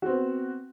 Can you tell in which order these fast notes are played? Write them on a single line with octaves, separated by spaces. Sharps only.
F#4 C4 B3